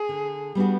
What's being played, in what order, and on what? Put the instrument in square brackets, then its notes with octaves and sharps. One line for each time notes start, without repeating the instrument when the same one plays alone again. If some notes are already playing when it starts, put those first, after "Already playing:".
Already playing: [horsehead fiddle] G#4
[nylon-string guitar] D3
G3 B3 D4 F#4